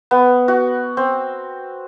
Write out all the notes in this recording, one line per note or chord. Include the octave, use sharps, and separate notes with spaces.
B3
F#4
C4